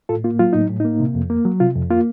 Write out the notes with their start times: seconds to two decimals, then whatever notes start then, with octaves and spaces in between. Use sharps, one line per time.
0.09 A2 F4 A4
0.24 A#3 F4
0.39 F#3 F4
0.53 A2 D#4
0.69 A2
0.80 A#3 D#4
1.00 C3
1.15 F2
1.30 A#3
1.45 F#3
1.60 C3 F4
1.76 F2
1.90 A#3 F4